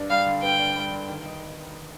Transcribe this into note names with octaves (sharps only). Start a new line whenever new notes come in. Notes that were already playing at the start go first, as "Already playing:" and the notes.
Already playing: G2 D4
G3 F5
D3
G2 G5
D4
G3
D3
D#3
D#4